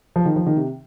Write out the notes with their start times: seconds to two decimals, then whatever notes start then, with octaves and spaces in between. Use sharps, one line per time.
0.16 F3
0.25 D#3
0.36 F3
0.46 D#3
0.57 C3